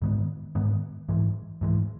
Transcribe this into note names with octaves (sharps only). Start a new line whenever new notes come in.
G#2 D#3 G#3 B3
G#2 D#3 G#3 B3
G#2 E3 G#3
G#2 E3 G#3